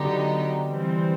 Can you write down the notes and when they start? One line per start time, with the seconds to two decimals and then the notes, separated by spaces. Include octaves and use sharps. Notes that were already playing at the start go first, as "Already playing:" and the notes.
Already playing: D3 F#3 B3 D#4 G4
0.67 E3 G3 C4